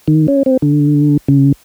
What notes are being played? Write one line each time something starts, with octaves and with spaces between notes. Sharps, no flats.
D#3
C#4
C4
D3
C#3